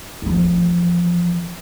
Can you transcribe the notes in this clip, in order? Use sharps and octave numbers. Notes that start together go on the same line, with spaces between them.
E2 F3